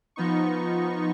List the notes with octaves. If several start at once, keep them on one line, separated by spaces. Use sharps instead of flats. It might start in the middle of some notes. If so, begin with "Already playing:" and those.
F3 B3 D#4 C#6